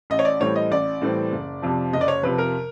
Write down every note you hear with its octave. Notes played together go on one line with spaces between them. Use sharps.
A1 D#5
C#5
D5
A2 E3 G3 C4 C#5
D#5
A1 D5
A2 E3 G3 C4
F#1
F2 C3 F3
F#1 D#5
D5
C#5
F2 C3 F3 B4
A#4